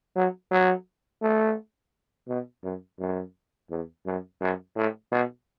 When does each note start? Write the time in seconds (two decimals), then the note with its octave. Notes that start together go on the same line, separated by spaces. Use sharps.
0.16 F#3
0.51 F#3
1.22 A3
2.28 B2
2.64 F#2
2.99 F#2
3.70 E2
4.06 F#2
4.41 F#2
4.76 A2
5.12 B2